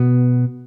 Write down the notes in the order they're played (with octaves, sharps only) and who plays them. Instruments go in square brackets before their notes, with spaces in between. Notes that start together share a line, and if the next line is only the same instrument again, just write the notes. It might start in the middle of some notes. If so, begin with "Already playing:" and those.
Already playing: [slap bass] B2 B3